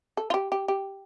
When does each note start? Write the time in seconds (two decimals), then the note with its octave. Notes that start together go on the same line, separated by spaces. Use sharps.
0.17 A4
0.30 F4
0.34 G4
0.52 G4
0.68 G4